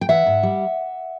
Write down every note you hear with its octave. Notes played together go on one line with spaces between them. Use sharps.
G5
E3 E5 F#5
G#2
G3